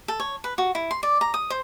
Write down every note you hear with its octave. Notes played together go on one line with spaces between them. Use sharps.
A4
C#5
B4
F#4
E4
C6
D5
A#5
D#6
C5